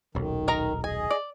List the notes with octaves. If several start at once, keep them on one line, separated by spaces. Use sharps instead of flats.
D#1 B1 D#3
D#4 A#4 A#5
G#4 D#5 G#5
D5